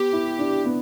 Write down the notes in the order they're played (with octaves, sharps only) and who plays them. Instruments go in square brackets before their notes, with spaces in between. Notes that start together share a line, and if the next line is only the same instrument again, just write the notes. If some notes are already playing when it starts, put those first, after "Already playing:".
Already playing: [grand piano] B3 [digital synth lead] G4
[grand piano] E4
D4
B3